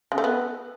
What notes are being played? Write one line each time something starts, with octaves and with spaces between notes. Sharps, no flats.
C#3
A3
B3